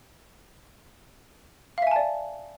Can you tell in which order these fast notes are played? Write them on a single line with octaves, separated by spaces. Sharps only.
F5 E5 G#5 A5 D5